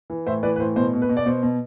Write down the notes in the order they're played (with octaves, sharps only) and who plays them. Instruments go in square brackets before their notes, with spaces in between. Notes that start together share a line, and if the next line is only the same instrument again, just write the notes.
[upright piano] E3
A2 C5 E5
E3 B4 D5
B4
A2 C5
B2 C5
B2
B4
B2
D5
B2 C5
B2